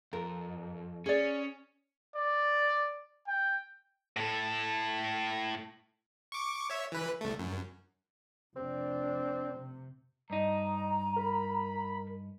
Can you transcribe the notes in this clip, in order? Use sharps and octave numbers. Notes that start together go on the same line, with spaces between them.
F2 A#4
C#4 G#4 D5
D5
G5
A2 A4
C#6 D6
C#5 E5
E3 B4
C2 A3
F#2
F1 C4 D4
C3
G2 D#4 D#5 A#5
A#4 B5